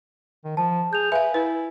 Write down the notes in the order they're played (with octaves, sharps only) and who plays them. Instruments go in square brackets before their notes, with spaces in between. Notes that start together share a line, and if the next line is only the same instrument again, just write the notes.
[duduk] D#3
[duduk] F3 [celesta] A5
[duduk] G#4 [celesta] G6 F7
[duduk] B4 [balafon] E5 F5 [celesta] G#5
[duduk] E4 [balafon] B4